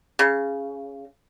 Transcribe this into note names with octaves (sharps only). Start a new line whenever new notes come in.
C#3